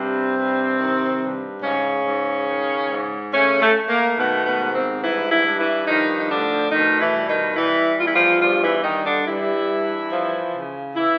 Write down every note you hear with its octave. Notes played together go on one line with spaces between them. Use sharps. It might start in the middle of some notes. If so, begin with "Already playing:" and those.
Already playing: G2 C3 C4
G2
D#3
G2
G#2 C#3 C#4
G#2
D#3
G#2
C#3 A3 C#4
A3
A3
A#3
B2 D#3 B3
B2 B3
G#2
C3 C4
G2 E3 E4
E3 E4
G2
E3 E4
D#3 F3 D#4
D#4
D3 A3 D4
B2 D#3 D#4
E3 E4
G3
D#3 D#4
E3 G3 E4
E2 F4
E4
F3 F4
G2 F3 F4
E3 E4
G2 D#3 D#4
D3 D4
E3 G3 E4
G2
F3
C#3
E3 E4